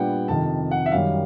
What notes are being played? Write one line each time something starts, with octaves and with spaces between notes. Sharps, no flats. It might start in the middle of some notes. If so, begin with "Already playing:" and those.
Already playing: A#2 G3 B3 D4 F#5 G5
F2 C3 D#3 A5
F#5
E5
F#2 D#3 G3 F5